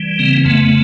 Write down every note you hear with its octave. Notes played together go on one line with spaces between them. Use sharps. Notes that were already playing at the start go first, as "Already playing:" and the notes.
Already playing: E3 G3
C#3 A#3 C4
F2 A3 B3